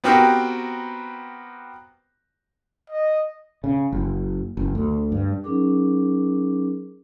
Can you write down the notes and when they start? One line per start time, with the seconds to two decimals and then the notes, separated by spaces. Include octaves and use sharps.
0.04 B3 C4 F#4 G4 A#4
2.90 D#5
3.64 C#3
3.92 F#1
4.57 F#1
4.75 D2
5.12 G2
5.44 F#3 C#4 D#4 G#4 A#4 D6